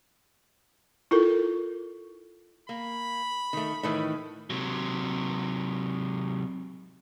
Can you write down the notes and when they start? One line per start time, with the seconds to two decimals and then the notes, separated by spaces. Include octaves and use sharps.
1.11 E4 F4 A4 A#4
2.69 A#3 B5
3.53 D#3 A3
3.83 A2 D#3 E3
4.50 C3 F#3